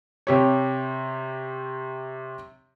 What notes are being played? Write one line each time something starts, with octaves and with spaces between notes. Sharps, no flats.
C3 G4 C#5